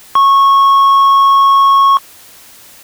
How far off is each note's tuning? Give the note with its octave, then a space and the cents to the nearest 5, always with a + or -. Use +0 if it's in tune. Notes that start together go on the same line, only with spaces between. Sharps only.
C#6 -15